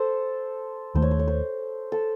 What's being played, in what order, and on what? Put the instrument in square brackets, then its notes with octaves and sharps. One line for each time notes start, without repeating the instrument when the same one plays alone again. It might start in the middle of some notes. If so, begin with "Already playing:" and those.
Already playing: [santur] A4 C5
[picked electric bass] D#2 D#3 A3 [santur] C5
[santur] C#5
C5
C#5
C5
A4